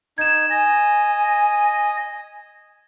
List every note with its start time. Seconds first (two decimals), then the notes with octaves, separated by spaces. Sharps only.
0.18 D#4 G#6 E7
0.50 D#5 G#5